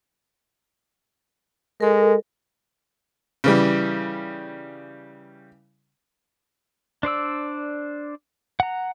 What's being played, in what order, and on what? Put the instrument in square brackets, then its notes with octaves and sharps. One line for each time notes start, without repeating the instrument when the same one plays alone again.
[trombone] G#3 [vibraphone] A4 A#4
[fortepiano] C#3 E3 G3
[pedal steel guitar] D4 C5 D5 E6
F#5 A#5